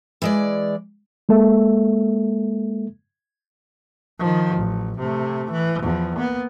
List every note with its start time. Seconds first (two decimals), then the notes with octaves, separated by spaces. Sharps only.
0.22 E3 G#3 D5
1.29 G#3 A#3 A4 E5
4.19 D#3 F3
4.56 A1
4.99 C3 A3
5.51 E3
5.82 E2 F3
6.16 A#3 B3